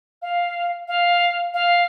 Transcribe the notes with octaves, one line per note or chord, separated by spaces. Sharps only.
F5
F5
F5